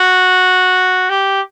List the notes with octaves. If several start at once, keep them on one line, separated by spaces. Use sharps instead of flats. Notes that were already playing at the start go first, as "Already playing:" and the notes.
Already playing: F#4
G4